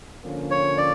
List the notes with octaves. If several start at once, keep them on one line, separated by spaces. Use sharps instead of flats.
D3 F3 A#3 C#4
C#5
D5